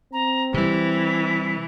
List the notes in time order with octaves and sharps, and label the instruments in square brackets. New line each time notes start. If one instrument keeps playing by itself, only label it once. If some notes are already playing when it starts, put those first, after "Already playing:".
[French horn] C4 [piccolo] A#5
[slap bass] C3 G3 [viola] E3 [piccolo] B6